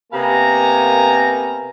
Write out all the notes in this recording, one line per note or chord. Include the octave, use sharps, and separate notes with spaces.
C3 A#3 B3 F5 G#5 A#5